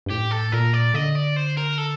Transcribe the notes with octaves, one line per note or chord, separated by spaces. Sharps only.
G2
A2 G4
A4
A#2 A#4
D5
D3 D#5
D5
C5
A#4
A4